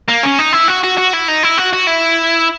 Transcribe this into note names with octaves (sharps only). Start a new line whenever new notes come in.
A#3
C#4
D#4
E4
F#4
F#4
F#4
E4
D#4
E4
F#4
F#4
E4